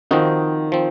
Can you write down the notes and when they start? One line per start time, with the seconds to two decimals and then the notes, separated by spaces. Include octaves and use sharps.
0.11 D#3 F3 C4 D#4 F#4
0.72 F3 C4